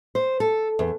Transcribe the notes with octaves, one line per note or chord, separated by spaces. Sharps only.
C5
A4
E2